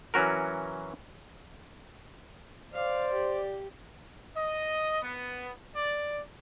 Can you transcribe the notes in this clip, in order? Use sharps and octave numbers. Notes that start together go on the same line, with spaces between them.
E3 F#3 C#4 F#4 A#4
C5 D5 F5
G4
D#5
B3
D5